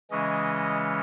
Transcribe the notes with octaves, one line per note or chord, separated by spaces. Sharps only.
C#3 E3 G#3 C#4 D#5